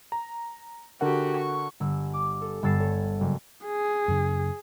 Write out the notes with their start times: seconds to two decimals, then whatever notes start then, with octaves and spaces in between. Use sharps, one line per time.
0.12 A#5
1.01 D3 F#4 G4 A#4 F#5
1.37 C#6
1.80 G1 E6
2.13 D6
2.41 A4
2.63 G1 G2 E6 A6 C7 E7
2.80 A4 C#5
3.20 F#1
3.65 G#4
4.08 F#2 C#3